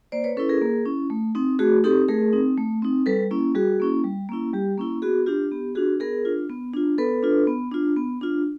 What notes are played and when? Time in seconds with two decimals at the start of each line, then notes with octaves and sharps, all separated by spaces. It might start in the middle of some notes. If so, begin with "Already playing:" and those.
0.12 A#3 C5 D5
0.24 B4 C#5
0.37 C#4 E4 A4 B4
0.49 G#4 A#4
0.61 A#3
0.86 C#4 E4
1.10 A3
1.35 C4 D#4
1.59 A3 F#4 G#4
1.84 C4 D#4 G4 A4
2.08 A3 G#4 A#4
2.33 C4 D#4
2.58 A3
2.82 C4 D#4
3.06 G3 A4 B4
3.31 A#3 C#4 E4
3.55 G3 F#4 G#4
3.80 A#3 C#4 E4
4.04 G3
4.29 A#3 C#4 E4
4.53 G3 G4
4.78 A#3 C#4 E4
5.02 B3 F#4 G#4
5.26 D4 F4 G4
5.51 B3 G4
5.75 D4 F4 F#4 G#4
6.00 B3 G#4 A#4
6.25 D4 F4
6.50 B3
6.73 D4 F4
6.98 B3 A4 B4
7.23 D4 F4
7.47 B3
7.72 D4 F4
7.96 B3
8.21 D4 F4